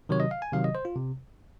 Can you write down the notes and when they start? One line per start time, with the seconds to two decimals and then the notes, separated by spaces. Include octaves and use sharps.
0.09 C3 D#3 F#3 C#5
0.20 D#5
0.31 F5
0.42 G#5
0.53 C3 D#3 F#3 F5
0.64 D#5
0.75 C5
0.85 F4
0.96 C3